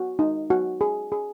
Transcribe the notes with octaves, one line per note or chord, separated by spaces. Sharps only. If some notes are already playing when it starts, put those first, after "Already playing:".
Already playing: F#4
D#4
F#4
G#4
G#4